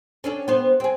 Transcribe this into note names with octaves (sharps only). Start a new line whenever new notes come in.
C#4 D4 A4
B3 C5
C4 G#4